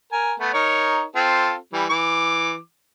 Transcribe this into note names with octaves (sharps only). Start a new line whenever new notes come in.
A#4 G#5
A3 B3
D#4 A#4 C#5
C4 F4 A4
E3 G3
E3 D6